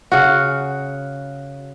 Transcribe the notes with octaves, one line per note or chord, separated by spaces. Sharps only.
C#3 F#4